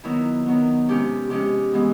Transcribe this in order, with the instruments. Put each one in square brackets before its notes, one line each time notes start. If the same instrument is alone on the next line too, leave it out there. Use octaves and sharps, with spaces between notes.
[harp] D#3 F#3 B3 E4
D#3 F#3 B3
C3 F3 G#3 C#4 G4
C3 F3 G#3 C#4 G4
E3 G#3 B3